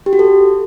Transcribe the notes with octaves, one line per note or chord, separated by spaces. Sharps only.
G4
F#4
A4